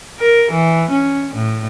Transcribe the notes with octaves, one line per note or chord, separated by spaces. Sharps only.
A#4
E3
C#4
A2